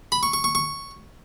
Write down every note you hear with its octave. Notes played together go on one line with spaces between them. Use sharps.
B5
C#6
C#6
C#6
C#6